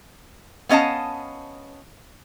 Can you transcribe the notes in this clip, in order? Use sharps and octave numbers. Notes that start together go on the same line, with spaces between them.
B3 C#4 D#5 F5 A5